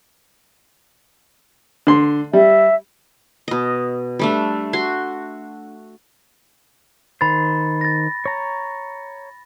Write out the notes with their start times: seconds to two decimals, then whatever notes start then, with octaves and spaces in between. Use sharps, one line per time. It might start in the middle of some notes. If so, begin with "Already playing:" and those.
1.87 D3 C6
2.33 G3 E5
3.48 B2 D#5
4.19 G3 A3 D4
4.73 F#4 C6
7.21 D#3 C5 B5 A6
7.81 A6 A#6
8.26 C#5 A#5